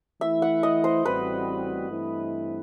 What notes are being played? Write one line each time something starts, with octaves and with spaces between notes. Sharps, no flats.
E3 A3 E4 E5
F#5
D#5
C5
A1 A2 G3 C4 F#4 B4
G2 E3 A3 C4 E4